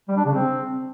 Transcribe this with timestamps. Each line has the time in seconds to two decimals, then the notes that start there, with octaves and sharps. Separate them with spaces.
0.08 G3
0.17 D4
0.25 C#3
0.34 C4